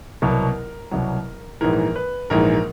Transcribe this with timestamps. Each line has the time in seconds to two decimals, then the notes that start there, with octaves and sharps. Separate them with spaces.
0.22 C2 B2 F#3 A#4
0.91 C2 B2 F#3
1.61 A#1 G#2 E3 A#4
1.96 B4
2.30 A#1 G#2 E3 A#4